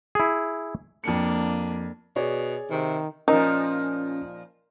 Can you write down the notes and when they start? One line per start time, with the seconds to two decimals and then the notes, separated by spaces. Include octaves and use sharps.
0.15 E4 G#4
1.04 F2 A#3 D4 C#7
2.16 B2 G#4 C#5 D5
2.70 C3 D#3
3.28 A#2 F3 C#4 D#4 A#4